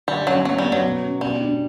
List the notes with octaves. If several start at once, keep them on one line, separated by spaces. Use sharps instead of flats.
D3 G3
F#3 C#4
F#3 B3
G3
B3
F#3
B2
C#4
B2 G3
D4